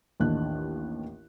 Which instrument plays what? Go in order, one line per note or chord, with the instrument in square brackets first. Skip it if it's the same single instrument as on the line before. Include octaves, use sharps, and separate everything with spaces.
[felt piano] A1 D#2 D#3 D4 F#6